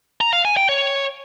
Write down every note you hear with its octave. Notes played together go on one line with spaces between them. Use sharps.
A#5
F5
G#5
G5
C#5